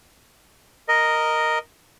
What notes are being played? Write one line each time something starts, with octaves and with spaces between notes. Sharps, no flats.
A#4 D#5